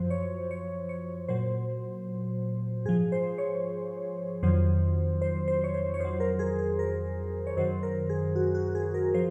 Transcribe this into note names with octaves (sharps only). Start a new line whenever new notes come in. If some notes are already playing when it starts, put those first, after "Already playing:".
Already playing: F#2 F3 C5
C#5
C#5
C#5
A#2 F#3 C5
G#2 F3 G#4
C5
C#5
F2 D#3 F#3 C5
C5
C5
C#5
C5
C#5
F2 D#3 F#3 C5
A#4
G#4
G#4
A#4
C#5
F#2 D#3 F#3 C5
A#4
G#4
F#4
F#4
G#4
A#4
F3 C5